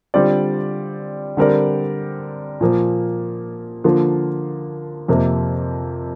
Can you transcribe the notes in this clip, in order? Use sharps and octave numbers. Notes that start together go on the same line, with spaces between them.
D3 G3 C4 F4 D5
D3 G3 C4 A#4 D5
A#2 F3 A#3
D3 F3 A#3 F4
F2 C3 A#3